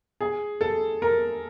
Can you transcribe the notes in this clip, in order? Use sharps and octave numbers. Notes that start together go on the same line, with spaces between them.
G#4
A4
A#4